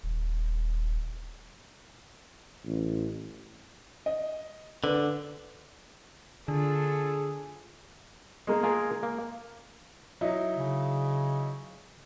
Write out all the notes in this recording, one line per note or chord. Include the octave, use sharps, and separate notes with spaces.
D#1
A1
D#5
D3 B4
D3 D4 F4 G#4 A4
G#3 A#3
F4 G#4 A#4
A#3
F#3 D#4 E4
C#3